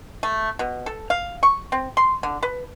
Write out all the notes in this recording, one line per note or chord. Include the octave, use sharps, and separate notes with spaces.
A3
B2
A4
F5
C#6
C4
C6
D3
B4